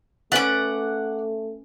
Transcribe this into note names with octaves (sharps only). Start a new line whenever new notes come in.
A3 C#4 B4 D5 F#5 D6